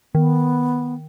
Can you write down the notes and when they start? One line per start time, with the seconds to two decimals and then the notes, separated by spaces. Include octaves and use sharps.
0.15 D#3 B3